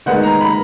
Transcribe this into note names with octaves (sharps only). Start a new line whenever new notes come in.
D#3 G#3 B3 F#5
A#5
B5